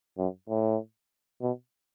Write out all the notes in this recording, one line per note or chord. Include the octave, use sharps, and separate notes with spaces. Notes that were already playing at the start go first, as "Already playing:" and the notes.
F#2
A2
B2